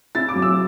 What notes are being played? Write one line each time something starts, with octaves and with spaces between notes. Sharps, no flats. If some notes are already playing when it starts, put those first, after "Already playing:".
E4 A6
D6
F#3
E6